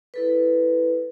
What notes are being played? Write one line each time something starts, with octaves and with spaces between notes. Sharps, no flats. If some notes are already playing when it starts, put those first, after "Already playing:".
E4 A4 B4